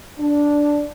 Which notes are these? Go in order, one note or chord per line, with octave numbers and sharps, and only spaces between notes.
D4